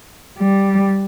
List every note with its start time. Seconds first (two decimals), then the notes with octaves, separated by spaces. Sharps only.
0.39 G3